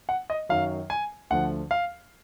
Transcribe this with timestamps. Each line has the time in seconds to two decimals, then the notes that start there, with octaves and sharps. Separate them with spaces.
0.09 F#5
0.30 D#5
0.49 F#2 D#3 F#3 F5
0.90 G#5
1.30 D2 D3 F3 F#5
1.71 F5